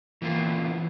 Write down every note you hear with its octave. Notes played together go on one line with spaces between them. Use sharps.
E3 A#3 F4